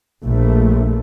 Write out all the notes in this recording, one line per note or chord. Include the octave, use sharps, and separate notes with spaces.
A#1 A3